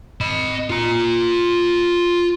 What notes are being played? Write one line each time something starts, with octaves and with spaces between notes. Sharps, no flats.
D#5 B5
F4 A#5